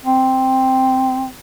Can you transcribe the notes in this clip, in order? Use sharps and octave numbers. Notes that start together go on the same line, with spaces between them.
C4